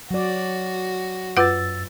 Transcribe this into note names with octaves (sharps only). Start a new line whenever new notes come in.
F#3 F#4 D5
F#2 F4 B4 F#5 E6 A6